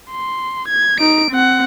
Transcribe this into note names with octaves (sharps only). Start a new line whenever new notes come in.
C6
G#6
D#4 D7
C4 F#5